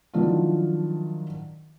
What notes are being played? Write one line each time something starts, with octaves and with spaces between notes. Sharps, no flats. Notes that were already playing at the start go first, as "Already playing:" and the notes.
D#3 F3 F#3 D4 E4 F4